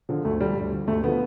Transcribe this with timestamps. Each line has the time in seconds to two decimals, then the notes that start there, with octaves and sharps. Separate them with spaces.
0.09 D3 F3
0.25 D2 A3
0.40 D3 F3 G3
0.56 D2
0.72 D3 F3
0.87 D2 A3
1.03 D3 F3 B3